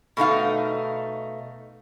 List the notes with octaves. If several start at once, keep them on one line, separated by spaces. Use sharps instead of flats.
B2 A3 D#4 F5